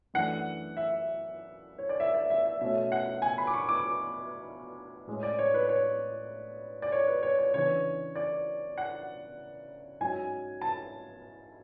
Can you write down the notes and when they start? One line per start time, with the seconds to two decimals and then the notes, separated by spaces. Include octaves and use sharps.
0.14 F#2 E3 A3 D4 F#5
0.77 E5
1.78 C#5
1.89 D5
2.00 E5
2.14 D5
2.30 E5
2.45 E5
2.61 B2 A3 C#4 E5
2.92 F#5
3.22 G#5
3.38 B5
3.47 D6
3.54 C#6
3.69 D6
5.07 A2 G#3 C#4
5.23 D5
5.39 C#5
5.54 B4
5.69 C#5
6.82 D5
6.92 C#5
7.07 B4
7.23 C#5
7.39 C#5
7.54 C#3 E3 B3 D4 C#5
8.16 D5
8.78 F#5
10.01 G#2 F#3 C#4 G#5
10.61 A5